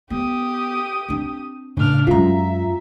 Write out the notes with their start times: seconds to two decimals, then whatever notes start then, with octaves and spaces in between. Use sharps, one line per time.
0.10 B3 G4 D#6
1.09 C4 D4
1.77 A2 C#3 D4 F6
2.07 F#2 G#3 F4 E5 A#5